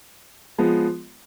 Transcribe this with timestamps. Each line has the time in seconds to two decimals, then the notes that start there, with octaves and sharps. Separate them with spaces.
0.58 F3 G#3 B3